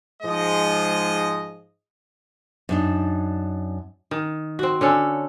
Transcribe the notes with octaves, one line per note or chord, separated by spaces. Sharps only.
G#2 F3 G#3 D#5
F#2 D4 D#4
D#3
C4 F#4
D3 C#4 A4